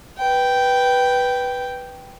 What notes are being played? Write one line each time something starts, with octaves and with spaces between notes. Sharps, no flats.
B4 G5